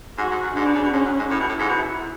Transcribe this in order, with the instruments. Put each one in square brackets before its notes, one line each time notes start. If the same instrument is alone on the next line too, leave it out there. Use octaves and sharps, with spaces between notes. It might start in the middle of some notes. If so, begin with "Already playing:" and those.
[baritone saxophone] G#2 [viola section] F#4
[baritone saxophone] G#2
F#2
[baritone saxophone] G#2 [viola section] D4
[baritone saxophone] B2
C#3
B2
[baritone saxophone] G#2 [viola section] C#4
[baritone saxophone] F#2
G#2
[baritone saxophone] A2 [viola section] E4
[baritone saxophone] B2
A2
G#2
B2